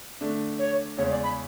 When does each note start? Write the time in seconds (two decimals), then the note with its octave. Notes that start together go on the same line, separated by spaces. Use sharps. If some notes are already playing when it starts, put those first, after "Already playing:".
0.21 D3 A3 D4
0.59 C#5
0.98 E2 C#3 G#3 C#4 C#5
1.11 D5
1.23 B5